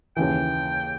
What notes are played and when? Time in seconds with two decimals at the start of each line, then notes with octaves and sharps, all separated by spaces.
0.17 D#2 C#3 E3 G5